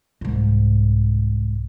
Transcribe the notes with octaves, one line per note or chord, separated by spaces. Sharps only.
C2 G#2